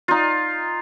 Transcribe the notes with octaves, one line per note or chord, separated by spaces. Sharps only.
D#4 F4